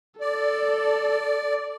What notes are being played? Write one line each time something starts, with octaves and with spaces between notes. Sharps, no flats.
A4 D5